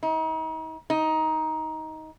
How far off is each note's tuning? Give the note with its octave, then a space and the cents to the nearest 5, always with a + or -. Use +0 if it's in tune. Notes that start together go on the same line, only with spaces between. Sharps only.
D#4 +40
D#4 +15